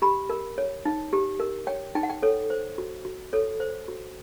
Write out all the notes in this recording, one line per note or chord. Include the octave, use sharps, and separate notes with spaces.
G4 B5
A#4
C#5
D#4
G4
A#4
C#5 G5
D#4 G5
F#5
G5
A4 C#5
C5
F#4
F#4
A4 C#5
C5
F#4